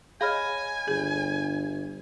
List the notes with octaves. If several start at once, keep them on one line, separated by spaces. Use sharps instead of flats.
G#4 C#5 D#5 F5 G#5 B5 F6
G1 G#4